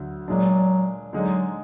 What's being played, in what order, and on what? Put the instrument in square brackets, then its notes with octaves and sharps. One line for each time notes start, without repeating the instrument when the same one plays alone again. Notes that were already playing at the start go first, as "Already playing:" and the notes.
Already playing: [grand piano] D2 D3 F#3
[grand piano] A#2 G#3 D4 [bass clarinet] F#3
[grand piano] D3 G#3 D#4 [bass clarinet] F#3